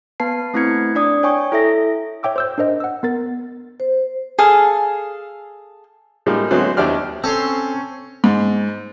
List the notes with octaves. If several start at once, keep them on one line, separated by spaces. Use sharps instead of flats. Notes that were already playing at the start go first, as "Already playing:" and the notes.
B3 B4 A5 C7
A3 C4 E4 B4 G#6 C#7
D4 D5 D#6
C#5 G5 G#5 C#6
E4 A4 E5 A#6
C#5 E5 G5 D6 E6
C5 E6 G6
D4 A#4 C5 D#5
F#5 E6
B3 A#4 A6
C5
G#4 A4 F5
A2 G3 G#3 A#3
D3 F#3 G#3 A3 B3 C4
D#2 D4 E4 G4 D5 F6
C4 C#4 A4 C#5 C6
G#2